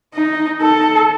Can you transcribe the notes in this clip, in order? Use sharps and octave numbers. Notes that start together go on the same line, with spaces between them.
D#4
A4